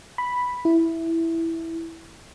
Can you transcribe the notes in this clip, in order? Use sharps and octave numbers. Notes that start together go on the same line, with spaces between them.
B5
E4